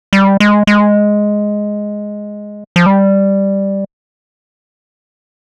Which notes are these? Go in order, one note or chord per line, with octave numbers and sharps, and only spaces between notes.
G3
G#3
G#3
F3
G3